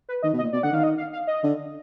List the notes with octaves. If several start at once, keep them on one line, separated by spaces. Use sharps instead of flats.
B4
D#3 D#5
B2
D#5
A#2
B2 D5
D3 F#5
D#3 F5
D#5
F5
F5
D#5
D3